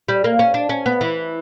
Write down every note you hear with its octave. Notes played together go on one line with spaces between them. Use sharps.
G3
A#3
C#4
D4
C#4
B3
E3